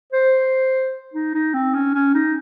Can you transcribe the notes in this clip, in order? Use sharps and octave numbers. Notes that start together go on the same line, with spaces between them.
C5
D#4
D#4
C4
C#4
C#4
D#4